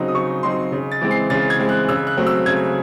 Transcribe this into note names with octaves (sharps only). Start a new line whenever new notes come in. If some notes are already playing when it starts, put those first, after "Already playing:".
Already playing: C#3 F#3 C4 D#4
D#6
C#3 C#6
F#3 C4 D#4 C6
C#3
A6
E3 G#3 C4
C7
C#3 A6
G#6
E3 G#3 C4
F#6
C#3 E6
F#6
F#3 A3 C4
E6
C#3 G#6